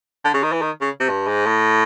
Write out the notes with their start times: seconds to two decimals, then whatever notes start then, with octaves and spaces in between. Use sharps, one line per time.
0.25 D3
0.34 C#3
0.43 D#3
0.52 E3
0.62 D#3
0.81 C#3
1.00 C3
1.09 G2
1.27 G#2
1.46 A2